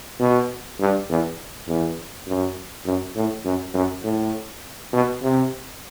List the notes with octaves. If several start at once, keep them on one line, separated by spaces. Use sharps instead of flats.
B2
G2
E2
E2
F#2
F#2
A2
F#2
F#2
A2
B2
C3